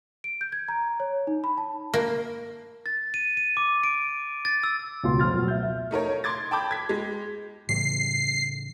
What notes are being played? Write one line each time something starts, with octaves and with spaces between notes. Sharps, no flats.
D7
G6
G#6
A#5
C#5
D#4
B5
A5
A#3
A6
D#7
D#7
D6
D7
A6
E6
C#2 B2 F4 C6
F2 C6 F6 A6
B2 F#3
E5 G6
E5
A3 D#4 A#4 C#5
C6 D6 G#6 A6
G5 A5 B5 D6 G6
G#6 B6
G#3
A2 C#3 E3 C7